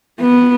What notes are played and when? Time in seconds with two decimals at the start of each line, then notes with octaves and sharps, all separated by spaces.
0.20 B3